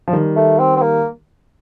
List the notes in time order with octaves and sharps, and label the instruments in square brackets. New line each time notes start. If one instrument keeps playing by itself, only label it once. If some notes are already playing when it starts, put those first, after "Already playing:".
[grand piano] F3
D#3 G3
[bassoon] A3
C4
C4
A#3